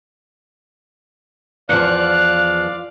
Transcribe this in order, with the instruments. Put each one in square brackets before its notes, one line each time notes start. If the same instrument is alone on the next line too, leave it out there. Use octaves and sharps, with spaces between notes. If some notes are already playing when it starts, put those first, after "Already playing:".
[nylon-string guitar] E2 F3 [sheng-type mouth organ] D5 F5 [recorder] F#6